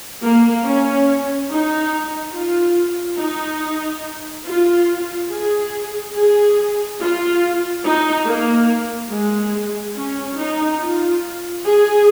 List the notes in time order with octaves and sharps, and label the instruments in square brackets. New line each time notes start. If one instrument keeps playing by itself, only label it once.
[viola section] A#3
C#4
D#4
F4
D#4
F4
G#4
G#4
F4
D#4
A#3
G#3
C#4
D#4
F4
G#4